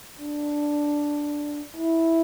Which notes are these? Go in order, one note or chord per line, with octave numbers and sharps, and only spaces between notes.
D4
E4